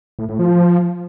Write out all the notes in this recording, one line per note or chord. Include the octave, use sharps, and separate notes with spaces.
A2
A2
F3